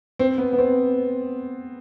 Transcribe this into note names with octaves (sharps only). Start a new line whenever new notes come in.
C4
B3
B3
C4